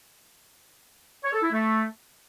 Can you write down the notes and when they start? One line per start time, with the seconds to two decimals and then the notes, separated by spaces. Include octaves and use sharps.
1.24 C#5
1.33 A4
1.42 E4
1.51 A3